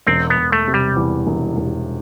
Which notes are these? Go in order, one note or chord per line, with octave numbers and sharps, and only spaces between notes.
E1 C4
B3
E1
A3
C3
G3
E2
E1
E1